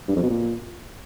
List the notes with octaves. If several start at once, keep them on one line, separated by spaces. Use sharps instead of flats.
G2
F2
B2
A#2